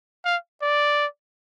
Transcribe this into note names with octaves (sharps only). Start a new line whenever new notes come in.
F5
D5